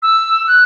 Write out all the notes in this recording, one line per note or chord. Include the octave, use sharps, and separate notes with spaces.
E6
F#6